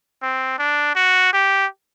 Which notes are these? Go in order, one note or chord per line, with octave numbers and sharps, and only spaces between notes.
C4
D4
F#4
G4